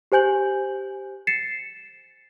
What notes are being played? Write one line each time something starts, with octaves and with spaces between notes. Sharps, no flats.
G4 C5 G#5 G6 F#7
A6 C7 C#7 E7